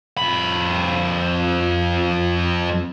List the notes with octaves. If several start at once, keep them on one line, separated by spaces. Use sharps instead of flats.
F2 B5